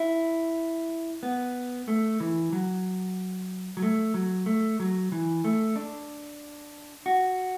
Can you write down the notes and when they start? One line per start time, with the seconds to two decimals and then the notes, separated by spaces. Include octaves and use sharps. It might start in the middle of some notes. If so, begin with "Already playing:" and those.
Already playing: E4
1.23 B3
1.88 A3
2.20 E3
2.53 F#3
3.77 F#3
3.82 A3
4.14 F#3
4.46 A3
4.80 F#3
5.12 E3
5.44 A3
5.76 D4
7.06 F#4